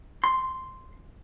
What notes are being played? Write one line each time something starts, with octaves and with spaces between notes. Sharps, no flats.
C6